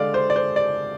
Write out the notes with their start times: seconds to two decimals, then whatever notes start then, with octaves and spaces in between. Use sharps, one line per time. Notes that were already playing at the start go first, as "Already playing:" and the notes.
Already playing: D3 G#3 D5 F5
0.14 C5
0.30 D5
0.36 C5
0.56 D5